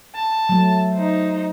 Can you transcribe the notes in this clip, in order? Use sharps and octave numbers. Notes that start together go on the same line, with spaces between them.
A5
F#3 A3
D#4 C5